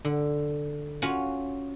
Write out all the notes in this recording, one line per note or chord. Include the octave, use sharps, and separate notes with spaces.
D3
C#4 F4 F#4 C#5